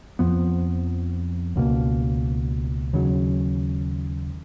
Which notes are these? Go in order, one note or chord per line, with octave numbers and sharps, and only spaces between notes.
F2 F3 B3
C#2 B2 A#3
D#2 C#3 F#3